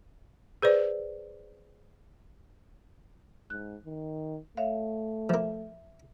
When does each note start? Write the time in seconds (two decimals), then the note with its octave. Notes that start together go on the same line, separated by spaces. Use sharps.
0.62 G#4 B4 C5 D5
3.50 G#2 F#6
3.85 D#3
4.57 A3 C#5 E5 F5
5.29 F3 A#3 E5